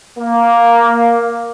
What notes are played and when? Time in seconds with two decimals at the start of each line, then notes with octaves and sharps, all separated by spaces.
0.18 A#3